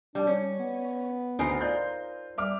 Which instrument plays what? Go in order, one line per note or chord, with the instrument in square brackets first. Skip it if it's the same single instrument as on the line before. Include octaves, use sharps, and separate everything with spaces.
[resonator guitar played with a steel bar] G3 [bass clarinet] D4 [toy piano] D#4 D5 D6
[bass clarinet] G3 [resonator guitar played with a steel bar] C#4
[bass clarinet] B3
[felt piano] D2 C7 [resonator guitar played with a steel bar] D#4 A#4 C5 [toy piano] F#5 G#5 B5
[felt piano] F4 G6 [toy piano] D5 D#5 C6
[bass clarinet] G3 [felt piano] E5 D6 F6